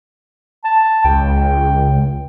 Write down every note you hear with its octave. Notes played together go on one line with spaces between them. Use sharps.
A5
C#2 G5